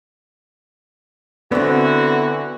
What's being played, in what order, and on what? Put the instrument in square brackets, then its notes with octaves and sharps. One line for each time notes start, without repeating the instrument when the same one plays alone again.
[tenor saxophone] D3 [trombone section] E3 F#4 [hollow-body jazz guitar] B3 C4